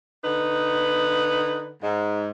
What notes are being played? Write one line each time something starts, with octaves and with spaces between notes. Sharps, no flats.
D3 D#4 B4
G#2